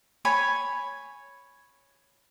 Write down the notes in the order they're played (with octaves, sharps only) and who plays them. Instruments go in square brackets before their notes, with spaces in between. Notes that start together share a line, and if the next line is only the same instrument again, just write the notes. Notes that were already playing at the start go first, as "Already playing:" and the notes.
[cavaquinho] C#5 G#5 B5